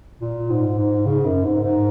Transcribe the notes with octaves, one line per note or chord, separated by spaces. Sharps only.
A#2
G#2
G#2
C#3
F#2
G#2
G#2